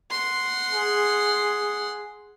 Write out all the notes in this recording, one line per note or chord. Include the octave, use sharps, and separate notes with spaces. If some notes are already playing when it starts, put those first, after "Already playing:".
F#5 C6
G#4